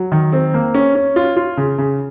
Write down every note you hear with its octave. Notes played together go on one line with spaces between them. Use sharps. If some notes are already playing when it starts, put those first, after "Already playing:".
Already playing: F#3
D#3
C4
A#3
C#4
C#4
F4
F4
C#3
C#3